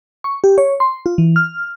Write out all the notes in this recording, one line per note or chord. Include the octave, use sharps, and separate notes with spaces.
C#6
G4
C#5
C6
F4
E3
F6